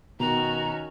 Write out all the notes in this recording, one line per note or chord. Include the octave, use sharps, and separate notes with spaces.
B2 D#3 C#4 F#4 A#5